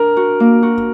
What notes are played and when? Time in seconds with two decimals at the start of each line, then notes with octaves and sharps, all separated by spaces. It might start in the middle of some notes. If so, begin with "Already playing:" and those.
Already playing: D4 A#4
0.17 F#4
0.40 A#3
0.63 F#4